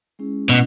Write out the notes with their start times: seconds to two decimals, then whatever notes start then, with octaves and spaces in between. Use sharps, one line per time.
0.19 G#3 C#4 E4 G#4
0.49 B2 A3 C#4 E4